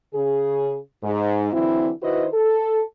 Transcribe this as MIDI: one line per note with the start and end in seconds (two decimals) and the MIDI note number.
0.13 0.78 49
0.13 0.78 68
1.02 1.48 44
1.52 1.90 50
1.52 1.90 52
1.52 1.90 54
1.52 1.90 60
1.52 1.90 64
2.01 2.26 51
2.01 2.26 64
2.01 2.26 66
2.01 2.26 71
2.01 2.26 72
2.01 2.26 75
2.33 2.82 69